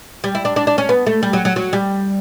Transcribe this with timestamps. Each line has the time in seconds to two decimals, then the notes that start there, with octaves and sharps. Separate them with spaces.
0.24 G3
0.35 E4
0.45 D4
0.56 D4
0.67 D4
0.78 C#4
0.89 B3
1.07 A3
1.23 G3
1.33 F#3
1.45 F#3
1.56 F#3
1.73 G3